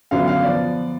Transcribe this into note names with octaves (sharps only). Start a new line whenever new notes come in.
F#2 D3 F#3 B3 F5
F5
F3 B3 D5